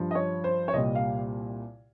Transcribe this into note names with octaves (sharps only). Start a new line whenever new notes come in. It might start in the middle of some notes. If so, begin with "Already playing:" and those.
Already playing: G2 F3
D#5
C#5
C5
C#5
C2 A#2 G3 D#5
F5